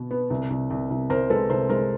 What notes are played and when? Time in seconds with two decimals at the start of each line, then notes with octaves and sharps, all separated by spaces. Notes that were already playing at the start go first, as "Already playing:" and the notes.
Already playing: B2 B3
0.11 B3
0.30 C2
0.50 C2
0.70 C2
0.90 C2
1.10 C2 A#4 C5
1.30 G#3 A4 B4
1.50 C2 A#4 C5
1.69 G#3 A#4 C5